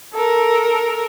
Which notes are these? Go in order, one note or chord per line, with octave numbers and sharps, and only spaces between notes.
A4 A#4